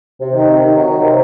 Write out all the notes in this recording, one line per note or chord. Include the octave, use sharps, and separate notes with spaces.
C3
D#3
C3
D#3
F#3
D#3
C3